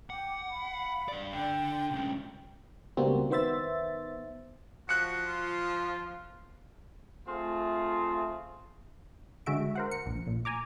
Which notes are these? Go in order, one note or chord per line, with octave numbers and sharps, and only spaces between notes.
F#5 G5 D6
F5 B5
G2 D5
D3 D4 G5
C2 C#4 G5
C#2 B2 G3 A#3 C4 F#4
D#3 B3 C5 E5 A6
F3 F#4 F#6 C#7
F4
A3 C4 F4 G#4
D3 G#3 F#4 E5 D7
A#4 C5 F#5
C#7
A#1
A#2
G#5 A#5 D6